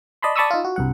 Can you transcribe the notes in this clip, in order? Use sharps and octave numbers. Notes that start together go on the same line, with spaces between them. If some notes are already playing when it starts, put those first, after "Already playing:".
D5 D#5 A5 B5 C6
D5 A5 B5 C#6 D#6 E6
D#4 F4
F#4
C2 G2 F#5